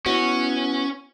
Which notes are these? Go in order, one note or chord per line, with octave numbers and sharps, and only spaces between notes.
B3 C#4 E4 F#4